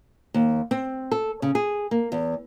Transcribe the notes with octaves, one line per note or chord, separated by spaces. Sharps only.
D#2
C4
A4
C#3
G#4
A#3
E2